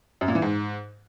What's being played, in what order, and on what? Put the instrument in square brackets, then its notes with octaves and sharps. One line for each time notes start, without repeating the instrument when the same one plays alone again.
[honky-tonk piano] F#2
A#2
E3
G#2